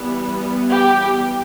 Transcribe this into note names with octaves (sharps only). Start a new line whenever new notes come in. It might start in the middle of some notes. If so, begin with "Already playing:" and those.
Already playing: E3 G3 B3
G4